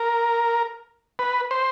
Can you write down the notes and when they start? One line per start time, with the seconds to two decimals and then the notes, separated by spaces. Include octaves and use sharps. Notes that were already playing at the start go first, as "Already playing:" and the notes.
Already playing: A#4
1.19 B4
1.51 C5